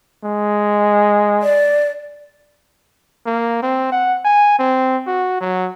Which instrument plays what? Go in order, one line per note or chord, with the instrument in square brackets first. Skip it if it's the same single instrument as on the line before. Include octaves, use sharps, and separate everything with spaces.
[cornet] G#3
[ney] D5
[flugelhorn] A#3
C4
F#5
G#5
C4
F#4
F#3